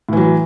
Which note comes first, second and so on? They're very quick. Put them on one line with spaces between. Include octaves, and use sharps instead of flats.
A2 E3 F#3